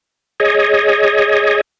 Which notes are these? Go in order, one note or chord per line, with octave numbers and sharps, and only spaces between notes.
G#4 C#5 D#5